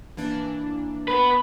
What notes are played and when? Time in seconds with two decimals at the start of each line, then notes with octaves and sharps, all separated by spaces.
0.17 E3 A#3 D4
1.08 B3 B4 B5